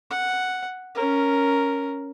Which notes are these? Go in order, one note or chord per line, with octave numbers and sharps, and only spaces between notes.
F#5
C#4 A#4